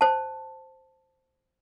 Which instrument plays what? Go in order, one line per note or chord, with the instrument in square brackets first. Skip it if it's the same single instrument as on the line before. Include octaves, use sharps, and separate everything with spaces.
[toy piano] C5 A5